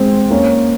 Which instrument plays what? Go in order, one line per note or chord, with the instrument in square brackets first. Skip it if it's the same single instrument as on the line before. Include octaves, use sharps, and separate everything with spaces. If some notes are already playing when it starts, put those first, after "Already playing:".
Already playing: [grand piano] G#3 C4
A#3 C#4